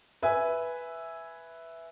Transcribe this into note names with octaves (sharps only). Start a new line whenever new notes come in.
B4 E5 G#5